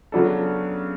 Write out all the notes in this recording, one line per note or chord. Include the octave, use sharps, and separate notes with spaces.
C#3 F#3 B3 D4 A4